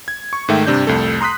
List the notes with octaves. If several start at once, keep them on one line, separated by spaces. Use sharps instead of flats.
G#6
C#6
G#2 D#3 A3 E5 G5
G2 C3 D4 G6
C2 F2 A3 A4
A#5 C6 D#6 F#6 B6